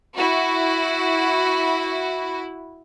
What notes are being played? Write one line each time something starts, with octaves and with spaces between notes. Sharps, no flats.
E4 F#4